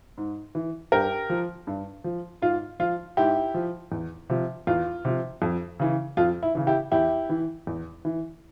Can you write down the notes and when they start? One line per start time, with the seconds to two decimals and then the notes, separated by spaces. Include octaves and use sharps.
0.18 G#2
0.55 E3
0.92 G2 G4 A#4
1.30 F3
1.67 G2
2.04 F3
2.42 G#2 F4
2.79 F3 F4
3.17 G#2 E4 G4
3.54 F3
3.92 E2
4.30 C3 F3
4.67 E2 F4
5.05 C3 F3
5.42 F2
5.80 C#3 E3
6.17 F2 F4
6.43 E4
6.55 C#3 E3
6.67 E4 G4
6.91 E2 E4 G4
7.29 E3
7.67 E2
8.05 E3